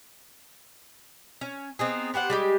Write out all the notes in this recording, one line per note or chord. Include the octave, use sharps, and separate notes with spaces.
C#4
B3 C4 D#4 G#4
B3 G4 C5 F#5
G3 G#3 G4